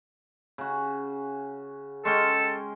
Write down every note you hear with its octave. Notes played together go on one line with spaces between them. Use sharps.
C#3 F#4
G#3 C#4 A4 G5